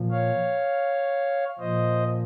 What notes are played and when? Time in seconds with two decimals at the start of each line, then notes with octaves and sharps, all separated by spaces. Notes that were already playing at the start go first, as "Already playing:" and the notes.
Already playing: A#2 F3
0.11 C#5 F5
1.59 A#2 F3 C5 D#5